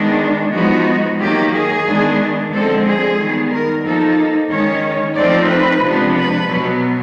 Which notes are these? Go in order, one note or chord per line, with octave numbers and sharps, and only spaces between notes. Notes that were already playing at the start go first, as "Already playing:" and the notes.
Already playing: D#3 G#3 B3 D4
F3 G#3 B3 D#4 F#4
D#3 F#3 A#3 G4
G#4
D#3 G#3 B3 D4
D3 F3 G#3 C4 A4
G#4
D#3 G3 B3
A#4
F3 A#3 D#4 A4
D#3 G#3 C#4 C#5
F3 A3 C4 D#4 D5
B4
C3 F3 G#3 B3 D4
B4
B2 F#3 B3